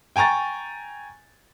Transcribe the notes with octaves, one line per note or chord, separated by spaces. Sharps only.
G5 G#5 A#5 C#6 A6